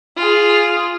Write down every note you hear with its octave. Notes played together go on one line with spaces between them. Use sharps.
F4 G#4